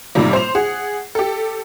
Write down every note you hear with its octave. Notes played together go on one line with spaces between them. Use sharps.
A2 C3 D#3 F3 G3 A#3
C5 F7
G#4 F#5
G4 A4